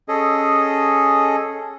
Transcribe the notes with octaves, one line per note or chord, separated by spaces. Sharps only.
C#4 G#4 A4 D#5